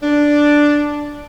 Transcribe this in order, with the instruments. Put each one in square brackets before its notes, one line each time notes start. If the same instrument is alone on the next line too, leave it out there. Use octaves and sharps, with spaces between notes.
[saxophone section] D4